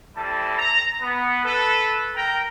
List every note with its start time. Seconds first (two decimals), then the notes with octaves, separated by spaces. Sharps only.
0.17 G3 C4 E4 A4 A5
0.58 A#5
1.01 B3
1.44 A4 B4
2.15 A#4 G5 A#5